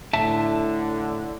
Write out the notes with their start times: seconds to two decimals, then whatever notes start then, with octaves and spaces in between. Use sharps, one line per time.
0.13 A2 D3 E5 A5